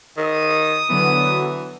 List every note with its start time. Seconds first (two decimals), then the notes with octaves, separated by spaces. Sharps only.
0.18 D#3 D#6
0.89 D3 E3 F#3 B3